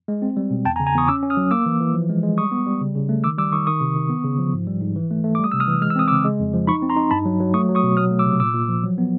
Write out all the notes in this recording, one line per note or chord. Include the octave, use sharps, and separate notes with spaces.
G#3
C4
G3
B2
E2 G5 A5
G#5 A#5
C#3
G#5 A#5
E2 C#6 D#6
C#4 D6 E6
C#4
D#6 F6
F#3
A#3 D6 E6
E3
E3
F3
G#3
G#3
G3 C#6 D#6
B3
G3
C#3
C#3
A3
D#3 D6 E6
G3 D6 E6
D#3 C#6 D#6
D#3 C#6 D#6
C3
D#3
B3
C#3
F3
G#2
G3
G#2
E3
A3
A3
D6
G3
D#6
C3 E6
D#6 F6
E3
G#3 F6
E6
C4 D#6
C#3 D6 E6
G#3
F2
F3
D#4 B5 C#6
C4
A#5 C6
D#4
G2 A5 B5
F#3
F#3
A3 C#6 D#6
F#3
C#6 D#6
B2
F#3 D#6 F6
A3
D6 E6
C3
A#2 D6 E6
A#2
F3
F#3
B3